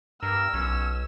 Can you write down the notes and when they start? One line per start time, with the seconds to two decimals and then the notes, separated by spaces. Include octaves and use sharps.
0.23 G2 A#4 E6
0.54 B1 C#4